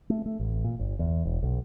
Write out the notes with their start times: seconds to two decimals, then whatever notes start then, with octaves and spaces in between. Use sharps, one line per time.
0.10 A3
0.26 A3
0.40 A1
0.64 A#2
0.79 G1
0.99 E2
1.25 E1
1.43 B1